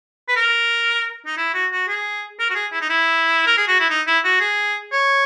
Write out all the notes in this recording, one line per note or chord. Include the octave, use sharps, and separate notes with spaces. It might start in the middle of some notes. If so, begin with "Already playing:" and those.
B4
A#4
D#4
E4
F#4
F#4
G#4
A#4
F#4
G#4
E4
D#4
E4
A#4
G#4
F#4
E4
D#4
E4
F#4
G#4
C#5